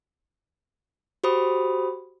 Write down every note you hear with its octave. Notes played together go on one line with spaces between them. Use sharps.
F#4 G4 C5 B5 D#6